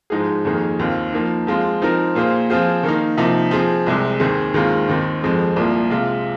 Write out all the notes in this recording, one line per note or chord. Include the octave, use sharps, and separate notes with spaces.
G#2 F3 G#3 D#4 G#4
F2 D#3 A#3 G#4
D#2 D#3 C4 F4
F3 A#3 D#4
F3 G#3 C4 F4
F3 C4 D#4 A#4
A#2 A#3 F4 G#4 C5
F3 C4 F4 G#4 C5
D#3 A#3 D#4
C3 F3 A#3 D#4
F3 C4 G#4
C2 C3 G#3
D#2 D#3 C4 G#4 C5
D#2 D#3 G#3 C4 F4
D#2 D#3 C4 D#4
F2 F3 G#3 C4
C2 A#2 F3 A#3
C3 G#3 F4